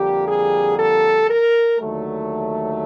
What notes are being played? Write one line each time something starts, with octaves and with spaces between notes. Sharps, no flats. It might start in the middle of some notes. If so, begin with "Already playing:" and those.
Already playing: F2 D3 G3 A#3 G4
G#4
A4
A#4
D#2 D3 F#3 A3